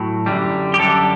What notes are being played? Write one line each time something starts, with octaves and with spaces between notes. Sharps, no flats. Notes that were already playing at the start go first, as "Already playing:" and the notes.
Already playing: A2 F#3
F#2 D3 G3
G4
F#2 D3 G3 A4